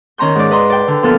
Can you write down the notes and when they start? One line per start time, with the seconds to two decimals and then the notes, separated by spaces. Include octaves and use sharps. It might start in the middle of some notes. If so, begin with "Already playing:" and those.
0.18 D#3 C#4 A#5 C6 G6
0.35 G#2 D5
0.51 B4 D#5 A#5 C6
0.70 D5 G5
0.88 D3
1.02 A#2 F3 B3 A4 F6